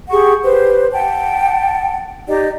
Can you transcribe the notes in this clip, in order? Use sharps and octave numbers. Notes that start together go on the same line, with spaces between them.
G4 G#4 F#5 C#6
G4 B4 C5
F#5 G5 A5
D#4 G4 D5 D#5